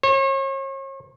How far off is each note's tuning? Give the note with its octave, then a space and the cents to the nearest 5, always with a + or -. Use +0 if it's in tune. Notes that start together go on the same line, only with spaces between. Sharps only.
C#5 -40